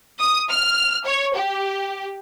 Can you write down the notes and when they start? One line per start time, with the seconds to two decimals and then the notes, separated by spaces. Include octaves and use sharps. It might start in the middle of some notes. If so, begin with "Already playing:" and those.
0.20 D#6
0.50 F6
1.05 C#5
1.35 G4